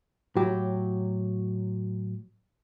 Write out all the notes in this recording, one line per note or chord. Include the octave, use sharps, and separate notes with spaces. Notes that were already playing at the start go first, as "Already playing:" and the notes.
A2 F#3 F#4 G4